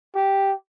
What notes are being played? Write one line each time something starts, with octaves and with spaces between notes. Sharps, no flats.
G4